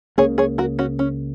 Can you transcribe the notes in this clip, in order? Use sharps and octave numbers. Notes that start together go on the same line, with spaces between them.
C#2 C#3 A#3 G#4 C#5
G#4 C#5
F#4 A#4
C#4 F#4
C#4